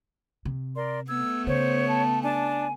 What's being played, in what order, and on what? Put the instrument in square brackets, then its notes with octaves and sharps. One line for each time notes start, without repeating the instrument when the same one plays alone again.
[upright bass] C3
[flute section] A#4 D5 C6
[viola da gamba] A3 B3 [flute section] E6 G#6
[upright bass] C#3 [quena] C5 [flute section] C#5
[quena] A5
[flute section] D4 A5 [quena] G#5